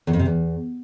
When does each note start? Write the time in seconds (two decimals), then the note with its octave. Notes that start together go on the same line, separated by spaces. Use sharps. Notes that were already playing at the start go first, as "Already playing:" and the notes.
0.07 E2
0.13 F2
0.19 C3
0.25 E2